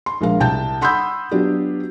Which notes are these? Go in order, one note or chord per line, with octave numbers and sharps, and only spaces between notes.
C6
A#1 G#3 A#4 F5
C2 G5 A5 G6
F#5 B5 C6 D#6 E6 G6
F#3 B3 D4 F4 G4